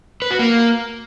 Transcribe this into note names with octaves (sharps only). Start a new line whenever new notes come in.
B4
F#4
A#3